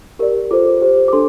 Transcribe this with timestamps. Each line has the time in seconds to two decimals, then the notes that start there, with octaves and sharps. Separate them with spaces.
0.19 G4 A#4 D5
0.51 F4 A4 C5 D6
0.82 G4 C5
1.08 D6
1.13 D4 A4 C6